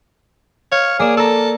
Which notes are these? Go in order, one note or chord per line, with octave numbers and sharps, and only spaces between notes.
C#5 F5
A#3 G#4 D5 E7
A4 A#5 E6